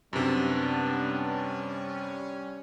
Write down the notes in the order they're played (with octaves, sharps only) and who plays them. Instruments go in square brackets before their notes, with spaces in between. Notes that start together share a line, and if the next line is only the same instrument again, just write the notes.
[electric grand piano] F#2 C3 [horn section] G3 C#4 [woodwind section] B3 D4